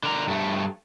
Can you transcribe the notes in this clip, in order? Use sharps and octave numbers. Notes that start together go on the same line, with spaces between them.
D3 A#4
G2 A3